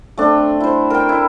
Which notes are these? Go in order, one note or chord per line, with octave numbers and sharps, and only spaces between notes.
A3 C4 D4
E4 C5
A#4 G5
E4